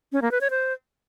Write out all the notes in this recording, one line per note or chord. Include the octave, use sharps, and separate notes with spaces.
C#4
A#3
B4
C#5
C5